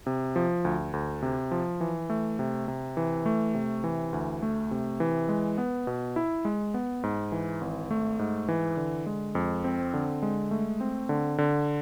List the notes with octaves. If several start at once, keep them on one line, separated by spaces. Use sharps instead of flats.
C3
F3
D2
D2
C3
F3
E3
A3
C3
C3
E3
A3
C3
E3
D2
A3
C3
E3
G#3
B3
B2
E4
G#3
B3
G#2
E3
G#1
A3
G#2
E3
D3
G#3
F2
C4
D3
G#3
A3
C4
D3
D3